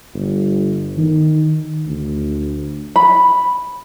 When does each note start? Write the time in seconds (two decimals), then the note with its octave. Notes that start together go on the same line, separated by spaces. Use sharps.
0.14 G1
0.97 D#3
1.86 D2
2.96 B5